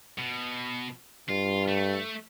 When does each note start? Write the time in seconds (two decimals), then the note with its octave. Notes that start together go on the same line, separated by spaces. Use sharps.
0.18 B2
1.29 G2 F4
1.68 A3